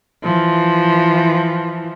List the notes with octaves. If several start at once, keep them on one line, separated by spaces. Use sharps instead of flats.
E3 F3